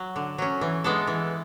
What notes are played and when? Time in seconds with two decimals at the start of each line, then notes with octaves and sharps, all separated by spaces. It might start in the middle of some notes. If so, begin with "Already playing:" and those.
Already playing: F#3
0.16 D3
0.38 F#3 C#4
0.61 E3
0.84 G#3 B3 D4 A4
1.07 E3